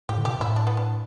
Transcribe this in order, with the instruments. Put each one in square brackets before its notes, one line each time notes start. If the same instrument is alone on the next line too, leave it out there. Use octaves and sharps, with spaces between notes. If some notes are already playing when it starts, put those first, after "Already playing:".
[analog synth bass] A2 [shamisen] G4
[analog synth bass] D3
[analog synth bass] B2 [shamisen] G4
[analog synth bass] A2 [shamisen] E4
[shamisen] D4
B3
D4